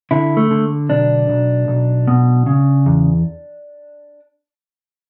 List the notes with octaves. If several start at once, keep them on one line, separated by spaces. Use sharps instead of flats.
D3 E4
A3
D3
B1 D4
B1
B1
B2
C#3
E2